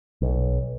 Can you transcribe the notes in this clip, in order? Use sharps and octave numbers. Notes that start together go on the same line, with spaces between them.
B1